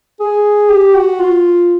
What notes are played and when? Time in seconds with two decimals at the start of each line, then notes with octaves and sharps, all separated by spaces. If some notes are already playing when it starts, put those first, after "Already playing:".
0.20 G#4
0.70 G4
0.95 F#4
1.20 F4